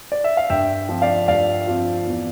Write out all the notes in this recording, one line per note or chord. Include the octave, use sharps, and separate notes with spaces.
D5
E5
F5
G2 E5 G5
F3 C4 F4
D5 F5
G2 D5 F5
F3 C4 F4
E2